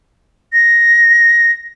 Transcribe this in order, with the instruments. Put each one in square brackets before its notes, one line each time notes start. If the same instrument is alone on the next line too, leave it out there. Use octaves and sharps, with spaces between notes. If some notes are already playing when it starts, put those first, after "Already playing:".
[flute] A#6